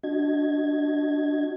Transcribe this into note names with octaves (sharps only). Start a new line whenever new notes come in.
D4 F#4 D#5 G#6